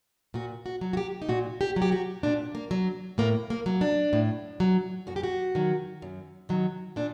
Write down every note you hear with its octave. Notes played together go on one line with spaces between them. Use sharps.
A#2 F#4
F#4
F#3
F#4
G4
D#4
A#2 F#4
G4
F#3
G4
F#4
A#2 D4
A#3
F#3
A2 A#3
A#3
F#3
D4
A2
F#3
F#2 F#4
G4
F#4
D#3 F#3
F#2
D#3 F#3
A#2 D4